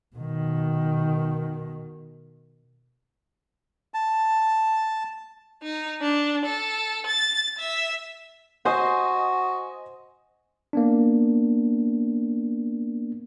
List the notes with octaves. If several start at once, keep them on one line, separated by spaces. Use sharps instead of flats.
B2 D#3
A5
D#4
D4
A4
A6
E5
F#4 C5 D#5 G#5 D#6
A#3 B3 D4